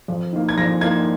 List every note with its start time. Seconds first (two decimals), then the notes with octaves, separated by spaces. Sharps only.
0.08 F2
0.33 D#3 A#3
0.49 G#6
0.58 F2 A#6
0.81 D#3 A#3 G#6